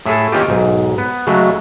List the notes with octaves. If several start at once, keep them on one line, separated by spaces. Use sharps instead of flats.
A2 E4 G#4 A4
D#3 A#3 C#4 D#4 F4 G4
B1 G#2
B3
C#3 F#3 G#3 A3